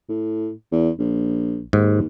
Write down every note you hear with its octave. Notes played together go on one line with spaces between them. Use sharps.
A2
E2
A#1
D#2 G#2